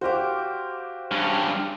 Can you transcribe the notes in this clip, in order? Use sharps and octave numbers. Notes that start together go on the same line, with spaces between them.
F#4 G4 C5 F5 D6
G2 C#4